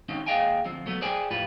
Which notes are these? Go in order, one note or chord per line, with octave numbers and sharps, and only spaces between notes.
D#3 C4 C#4 D#4
D#2 G#4 D#5 F5 G5 G#5
D2 F3 C4
F#3 A3 B3
G#4 C5 D5 G5 G#5
F2 A2 F4 G4 B4